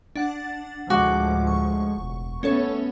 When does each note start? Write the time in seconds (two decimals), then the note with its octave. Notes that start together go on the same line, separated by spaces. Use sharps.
0.16 D4 F#5 A6
0.90 D2 A2 F3 G#3 F#4 D6
1.47 C#6
1.98 E1
2.43 A3 B3 C#4 A4 C#5